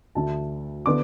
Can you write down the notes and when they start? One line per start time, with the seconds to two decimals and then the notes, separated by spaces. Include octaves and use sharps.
0.15 D2 D3 A3 A5
0.86 D3 B3 D6